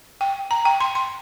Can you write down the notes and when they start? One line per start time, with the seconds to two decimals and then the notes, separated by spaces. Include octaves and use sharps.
0.21 G5
0.51 A#5
0.65 G5
0.80 C6
0.95 C6